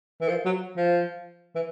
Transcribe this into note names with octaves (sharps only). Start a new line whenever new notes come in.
E3
F3
F#3
F3
E3